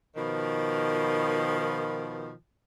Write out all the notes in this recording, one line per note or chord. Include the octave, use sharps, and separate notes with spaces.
B2 D#3 F3